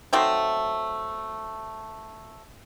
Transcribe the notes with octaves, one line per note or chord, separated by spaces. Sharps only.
F#3 A3 C4 D#4